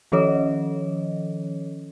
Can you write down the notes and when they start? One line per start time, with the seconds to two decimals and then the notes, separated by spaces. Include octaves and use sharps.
0.12 D#3 F3 C#4 A4 C#5 D#5